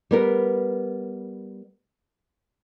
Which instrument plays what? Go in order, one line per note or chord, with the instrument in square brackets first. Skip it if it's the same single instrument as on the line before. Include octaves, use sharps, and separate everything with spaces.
[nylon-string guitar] G3 B3 A#4